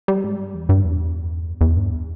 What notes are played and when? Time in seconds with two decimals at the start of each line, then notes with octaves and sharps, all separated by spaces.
0.08 G3
0.24 G#2
0.39 G2
0.55 E2
0.69 G2
0.85 E2
1.61 E2
1.77 G2